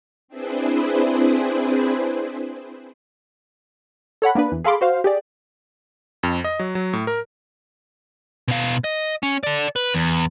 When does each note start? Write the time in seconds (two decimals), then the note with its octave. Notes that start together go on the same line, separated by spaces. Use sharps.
0.28 C4 D4 E4 G#4 B4 C5
4.22 A4 C#5 F#5 B5
4.35 A#3 B3 D4 B4
4.52 E2
4.64 G#4 A4 F5 B5 C6 D6
4.81 F#4 C5 F5
5.04 G4 G#4 D5
6.23 F2
6.44 D#5
6.59 F#3
6.75 F#3
6.93 A2
7.07 A#4
8.48 B2 F5
8.84 D#5
9.23 C#4
9.43 A4 D5
9.76 B4
9.94 E2